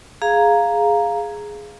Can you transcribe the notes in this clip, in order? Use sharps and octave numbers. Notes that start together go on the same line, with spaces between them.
G#4 F5 A#5